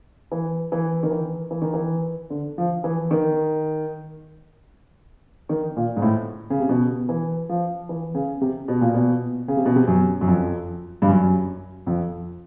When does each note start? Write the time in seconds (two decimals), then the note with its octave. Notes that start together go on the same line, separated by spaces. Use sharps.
0.31 E3
0.72 E3
1.03 D#3
1.11 E3
1.51 E3
1.62 D#3
1.74 E3
2.30 D3
2.58 F3
2.84 E3
3.11 D#3
5.49 D#3
5.76 A#2
5.96 G#2
6.02 A2
6.50 C#3
6.60 C3
6.69 B2
7.09 E3
7.49 F3
7.89 E3
8.15 C#3
8.41 C3
8.68 B2
8.81 A#2
8.94 B2
9.48 C#3
9.57 C3
9.66 B2
9.76 C3
9.87 F#2
10.21 F#2
10.28 F2
11.02 G2
11.08 F#2
11.87 F2